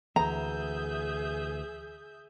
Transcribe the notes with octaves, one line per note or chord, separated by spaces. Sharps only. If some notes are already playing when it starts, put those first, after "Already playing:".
D2 E3 G#4 E5 A#5 G6